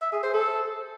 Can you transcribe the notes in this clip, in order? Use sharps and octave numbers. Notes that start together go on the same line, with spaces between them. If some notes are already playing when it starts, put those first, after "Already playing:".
E5
G#4
C5
A4